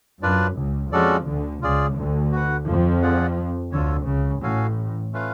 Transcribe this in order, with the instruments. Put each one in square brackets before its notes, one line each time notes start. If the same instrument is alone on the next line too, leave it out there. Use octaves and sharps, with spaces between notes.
[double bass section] F#2 [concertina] D4 F4 B4 D5
[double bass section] C#2 C#3
[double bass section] F2 F3 [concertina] G#3 C#4 F#4 A4 D5
[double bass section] D2 D3
[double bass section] C#2 C#3 [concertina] F4 G#4 D5
[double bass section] D2 D3
[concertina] F#4 B4 F#5
[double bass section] F2 F3
[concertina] F4 G#4 D5 F#5
[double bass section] D2 D3 [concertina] F4 A4 C#5
[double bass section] C#2 C#3
[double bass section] A1 A2 [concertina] C#4 F#4 A4 F5 G#5
[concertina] A3 C#4 F4 B4 F5